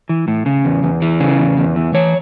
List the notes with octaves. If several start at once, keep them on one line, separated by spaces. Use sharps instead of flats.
E3
A2
C#3
E2
E2
E3
C#3
E2
E2
E3
E3 C#5